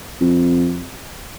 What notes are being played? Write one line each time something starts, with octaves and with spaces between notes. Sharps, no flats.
F2